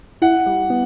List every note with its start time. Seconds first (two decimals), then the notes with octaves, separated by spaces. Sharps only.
0.22 E4 F#5
0.46 G3
0.70 B3